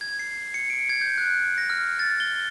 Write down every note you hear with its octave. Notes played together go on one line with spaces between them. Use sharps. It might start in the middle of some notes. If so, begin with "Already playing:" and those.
G#6
C7
C#7
D7
G#6
G6
F#6
A#6
F6
A6
G7